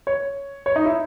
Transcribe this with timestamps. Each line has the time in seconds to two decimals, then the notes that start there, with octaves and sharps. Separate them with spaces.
0.07 C#5
0.66 C#5
0.76 D#4
0.86 E4